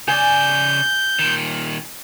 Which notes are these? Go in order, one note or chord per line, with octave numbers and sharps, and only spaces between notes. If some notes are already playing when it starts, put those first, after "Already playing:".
C#3 D5 G#5 G6
A#2 D#3